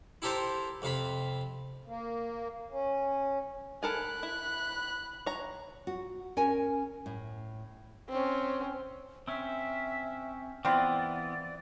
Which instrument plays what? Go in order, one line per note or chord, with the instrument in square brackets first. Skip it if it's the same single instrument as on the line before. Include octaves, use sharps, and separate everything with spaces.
[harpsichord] E4 G4 A4 A#4 C5
F2 C3 F5 B5
[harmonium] A#3
C#4
[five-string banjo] A4 A#4 G#5 [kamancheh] B5 F#6
[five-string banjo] E4
C#5 A#5
[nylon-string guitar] F#4
C#4 A#4 G#5
A2
[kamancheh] C4 C#4
[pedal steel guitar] C4 C#4 [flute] E5
[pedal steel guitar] E3 B3 [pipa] C4 E4 F4 [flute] D5